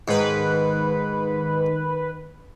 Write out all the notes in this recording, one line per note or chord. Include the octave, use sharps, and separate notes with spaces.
G#2 D#3 B4